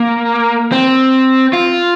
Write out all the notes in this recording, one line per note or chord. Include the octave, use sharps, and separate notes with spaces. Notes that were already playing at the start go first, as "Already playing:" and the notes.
Already playing: A#3
C4
F4